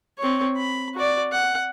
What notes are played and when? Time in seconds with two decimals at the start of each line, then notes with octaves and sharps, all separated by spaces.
0.19 C4 C#5
0.58 B5
0.94 F#4 D5
1.32 F#5